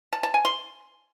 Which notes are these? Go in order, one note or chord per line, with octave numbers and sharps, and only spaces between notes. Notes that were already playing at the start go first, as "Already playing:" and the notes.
A5
A5
G#5
C6